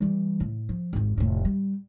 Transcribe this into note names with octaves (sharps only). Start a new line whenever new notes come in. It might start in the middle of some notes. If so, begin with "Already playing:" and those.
E3 G3
A2
F3
G#1 F2
F1 A2
G3